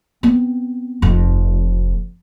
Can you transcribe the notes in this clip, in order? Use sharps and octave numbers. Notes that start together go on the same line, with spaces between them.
B3 C4
F1 F2